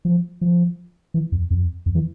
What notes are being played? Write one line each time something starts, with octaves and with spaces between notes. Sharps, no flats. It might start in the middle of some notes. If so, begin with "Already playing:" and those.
F3
F3
E3
F2
F2
F2
E3